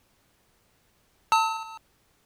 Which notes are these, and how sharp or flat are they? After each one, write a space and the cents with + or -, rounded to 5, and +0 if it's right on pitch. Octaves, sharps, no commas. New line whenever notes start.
A5 +30 E6 -40